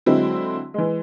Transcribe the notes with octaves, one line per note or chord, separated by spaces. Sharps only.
D3 F#3 G#3 C4 E4
E3 G#3